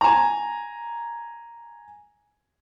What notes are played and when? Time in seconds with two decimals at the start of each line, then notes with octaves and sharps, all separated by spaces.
0.01 G#5 A#5